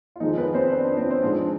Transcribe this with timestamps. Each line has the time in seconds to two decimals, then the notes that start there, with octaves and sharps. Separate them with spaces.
0.16 F4
0.20 F2 D#3 G#3 D#4
0.37 B3 B4
0.54 C4 C5
0.71 D4 D5
0.97 C4 C5
1.11 C5
1.22 G#2 F3 G#3 D4 D5